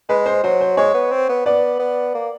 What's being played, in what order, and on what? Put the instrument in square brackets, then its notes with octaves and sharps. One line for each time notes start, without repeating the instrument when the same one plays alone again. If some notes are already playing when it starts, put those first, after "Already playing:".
[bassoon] G#3 [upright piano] B4
[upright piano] C5
[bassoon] F#3 [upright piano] C5
[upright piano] C5
[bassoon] G#3 [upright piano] C#5
[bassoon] B3
C4
B3
[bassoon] B3 [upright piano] D5
[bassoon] B3
A#3